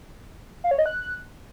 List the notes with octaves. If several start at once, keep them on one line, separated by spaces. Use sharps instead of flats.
F5
C#5
D#5
F#6